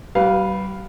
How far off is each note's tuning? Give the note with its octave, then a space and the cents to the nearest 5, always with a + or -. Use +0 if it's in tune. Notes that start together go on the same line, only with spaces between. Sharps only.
G3 -40 B4 +0 F5 +0